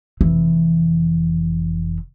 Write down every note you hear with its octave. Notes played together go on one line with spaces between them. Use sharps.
F1 E3